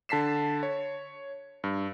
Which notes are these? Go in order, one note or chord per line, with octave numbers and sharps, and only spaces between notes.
D3 A5 B6 C7 E7
C#5
G2